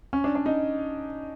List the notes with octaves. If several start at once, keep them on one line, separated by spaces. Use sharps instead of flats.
C#4
D4
D4
D#4